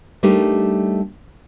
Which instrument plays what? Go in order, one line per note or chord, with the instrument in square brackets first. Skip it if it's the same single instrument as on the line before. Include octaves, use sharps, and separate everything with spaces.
[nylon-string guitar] G3 A3 D4 D#4 G4 A#4